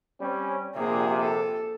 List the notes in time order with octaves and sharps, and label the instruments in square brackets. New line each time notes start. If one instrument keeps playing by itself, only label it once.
[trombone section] G3 C4 C#4
[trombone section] A#1 C3 [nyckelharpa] A#3 G#4
[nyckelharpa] A4